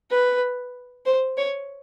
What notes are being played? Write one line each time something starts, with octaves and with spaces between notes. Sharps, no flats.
B4
C5
C#5